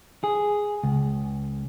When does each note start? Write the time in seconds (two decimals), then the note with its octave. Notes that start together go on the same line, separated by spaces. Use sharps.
0.24 G#4
0.83 C#2